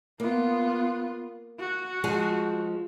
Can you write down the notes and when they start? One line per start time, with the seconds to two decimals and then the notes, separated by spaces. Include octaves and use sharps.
0.20 A#3 B3 F4
1.59 F#4
2.04 F3 G#3 G#4